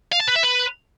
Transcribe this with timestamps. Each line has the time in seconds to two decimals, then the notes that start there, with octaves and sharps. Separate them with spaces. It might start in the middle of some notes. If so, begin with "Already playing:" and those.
0.12 F5
0.20 A5
0.27 B4
0.35 E5
0.43 B4